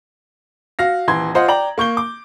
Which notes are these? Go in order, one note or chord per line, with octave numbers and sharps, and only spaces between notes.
F#4 F5 A#6
D#1 E3 C6 G#6
F4 C5 D#5 F#5
D5 G5 A#5 F#7
A#3 C#6 G6 G7
D6